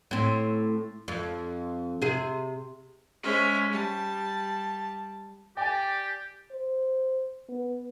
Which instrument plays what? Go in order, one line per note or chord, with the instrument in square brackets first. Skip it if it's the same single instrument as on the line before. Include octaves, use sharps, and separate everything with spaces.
[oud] A2 C4
F2
C3 G#4
[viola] G#3 C#4 [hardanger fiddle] C5 E5
[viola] G3 [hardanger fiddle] A5
[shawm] G4 [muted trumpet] D5 [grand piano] G5 G#5
[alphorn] C5
B3